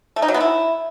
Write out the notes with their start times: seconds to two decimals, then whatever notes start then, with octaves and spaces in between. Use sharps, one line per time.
0.16 A3
0.22 D#4
0.28 F#3
0.34 B3
0.40 E4